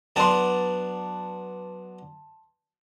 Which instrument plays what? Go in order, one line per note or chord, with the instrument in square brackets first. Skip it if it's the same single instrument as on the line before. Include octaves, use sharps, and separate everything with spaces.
[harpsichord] F#3 B3 D4 [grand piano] A5 C6